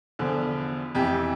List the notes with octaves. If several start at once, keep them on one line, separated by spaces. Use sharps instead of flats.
E2 D3 F3
F2 E3 G4